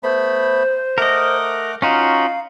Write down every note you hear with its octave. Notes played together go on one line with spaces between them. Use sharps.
A3 B3 C5 B5
A3 A#4 D#5 F#5 D6
C#4 D#4 F4 F#4 F5